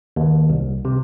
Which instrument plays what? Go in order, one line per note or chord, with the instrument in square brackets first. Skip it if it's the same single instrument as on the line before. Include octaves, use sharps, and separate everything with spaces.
[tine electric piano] D#2
C2
C3